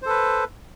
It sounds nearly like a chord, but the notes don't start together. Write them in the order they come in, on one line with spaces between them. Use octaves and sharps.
C5 A4 B4